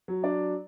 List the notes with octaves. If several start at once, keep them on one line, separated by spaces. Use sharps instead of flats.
F#3
D4 D5